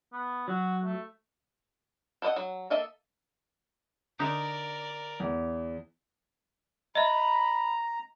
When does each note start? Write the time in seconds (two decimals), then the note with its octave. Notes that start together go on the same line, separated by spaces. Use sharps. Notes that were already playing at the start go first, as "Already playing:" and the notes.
0.13 B3
0.48 F#3 F#4
0.84 A3
2.22 A4 B4 C5 D#5 F#5
2.36 F#3
2.70 A#3 A4 D#5 E5 A5
4.19 D3 D#4 A#4 D5 E5
5.20 E2
6.95 D#5 E5 A#5 B5